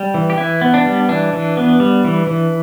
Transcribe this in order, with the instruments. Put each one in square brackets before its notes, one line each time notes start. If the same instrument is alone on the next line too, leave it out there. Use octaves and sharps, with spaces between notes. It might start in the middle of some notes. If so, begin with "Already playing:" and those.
Already playing: [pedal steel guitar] G3
E3
G4
E3 E4
B3
D4
G3
E3 D4
E3
B3
G3
E3
E3